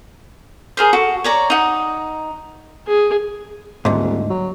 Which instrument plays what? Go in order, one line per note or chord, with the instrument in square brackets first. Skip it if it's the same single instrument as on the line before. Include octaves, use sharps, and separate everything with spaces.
[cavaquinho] G#4 A#4 C5
F#4 A4
C#5 D5 A#5
D#4 F#5
[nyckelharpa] G#4
[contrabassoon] D#1 [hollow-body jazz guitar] D2 G#2
[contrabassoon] F#3